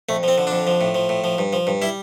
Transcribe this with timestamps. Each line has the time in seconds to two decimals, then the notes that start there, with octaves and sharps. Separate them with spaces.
0.09 F2 A3
0.23 F3 C4
0.38 D3
0.47 F2 D4
0.67 F3
0.81 A2
0.95 F3
1.09 A2
1.24 F3
1.38 G2
1.53 F3
1.67 G2
1.82 G3 E4